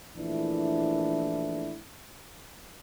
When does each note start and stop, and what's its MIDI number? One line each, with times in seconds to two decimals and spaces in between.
0.18 1.77 34
0.18 1.77 52
0.18 1.77 57
0.18 1.77 62
0.18 1.77 64